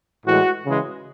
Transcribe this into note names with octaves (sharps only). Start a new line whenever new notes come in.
A2 E3 G#3 F#4
C#3 E3 G#3